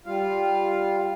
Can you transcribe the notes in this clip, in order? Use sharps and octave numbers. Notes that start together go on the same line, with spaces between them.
G3 F4 F5